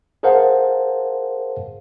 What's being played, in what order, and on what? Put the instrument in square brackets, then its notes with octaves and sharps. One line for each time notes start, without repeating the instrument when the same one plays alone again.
[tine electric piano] G#4 A#4 C5 F5 F#5 A5